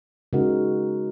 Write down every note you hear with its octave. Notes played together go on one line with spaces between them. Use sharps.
C#3 G#3 D#4 F#4 A#4